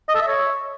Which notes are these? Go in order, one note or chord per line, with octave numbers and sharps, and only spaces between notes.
D#5
A4
E5
C#5